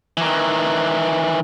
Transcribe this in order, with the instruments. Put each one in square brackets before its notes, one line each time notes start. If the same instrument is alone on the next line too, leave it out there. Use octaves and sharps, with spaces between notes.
[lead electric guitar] D#3 E3